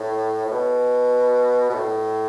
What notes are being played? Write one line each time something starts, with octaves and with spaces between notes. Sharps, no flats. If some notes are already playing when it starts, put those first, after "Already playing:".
Already playing: A2
A2
B2
B2
A2